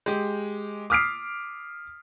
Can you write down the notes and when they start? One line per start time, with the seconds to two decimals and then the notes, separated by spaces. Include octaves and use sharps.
0.06 G#3 G4
0.90 D6 D#6 F6 B6 C7 D7